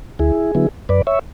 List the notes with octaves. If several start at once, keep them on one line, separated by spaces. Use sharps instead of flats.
D2 E4 G#4
D3 F#3 B3 E4
F#2 B4 D5
C#5 E5